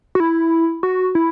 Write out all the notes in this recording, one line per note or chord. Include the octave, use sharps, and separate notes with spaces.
F#4
E4
F#4
E4